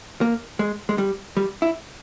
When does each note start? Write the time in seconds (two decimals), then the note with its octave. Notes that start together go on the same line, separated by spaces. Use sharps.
0.21 A#3
0.59 G#3
0.89 G#3
0.98 G3
1.37 G3
1.62 E4